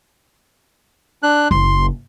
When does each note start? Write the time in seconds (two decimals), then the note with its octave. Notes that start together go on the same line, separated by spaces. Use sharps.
1.23 D4 F#6
1.51 F#1 C6